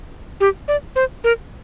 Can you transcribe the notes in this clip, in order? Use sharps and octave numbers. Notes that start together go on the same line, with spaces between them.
G4
D5
C5
A#4